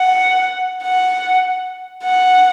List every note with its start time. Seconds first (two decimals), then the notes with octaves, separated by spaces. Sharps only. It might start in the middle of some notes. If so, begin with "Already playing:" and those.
Already playing: F#5
0.82 F#5
2.04 F#5